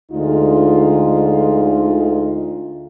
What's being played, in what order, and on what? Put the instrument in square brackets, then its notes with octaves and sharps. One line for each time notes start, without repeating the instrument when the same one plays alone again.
[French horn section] D2 D3 G#3 D#4 F4